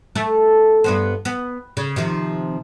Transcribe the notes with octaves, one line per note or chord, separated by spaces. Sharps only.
A3
G2 B3 C5
B3
C#3
C3 D#3 F3